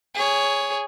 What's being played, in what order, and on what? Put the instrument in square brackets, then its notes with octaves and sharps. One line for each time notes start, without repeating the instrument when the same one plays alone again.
[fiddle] G#4 C#5